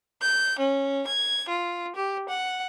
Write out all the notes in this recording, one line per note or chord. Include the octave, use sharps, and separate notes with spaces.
G6
C#4
G#6
F4
G4
F#5